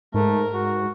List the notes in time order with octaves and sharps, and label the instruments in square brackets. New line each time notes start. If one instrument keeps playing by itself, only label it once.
[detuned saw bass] G#2 [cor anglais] A3 [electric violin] A#4
[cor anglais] F#4